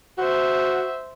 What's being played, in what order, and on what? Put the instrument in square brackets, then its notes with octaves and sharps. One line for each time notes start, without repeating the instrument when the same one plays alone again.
[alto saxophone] F#4 [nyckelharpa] C5 E5